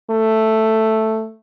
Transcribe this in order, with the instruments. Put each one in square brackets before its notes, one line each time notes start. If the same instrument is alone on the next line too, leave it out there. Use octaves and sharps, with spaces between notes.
[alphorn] A3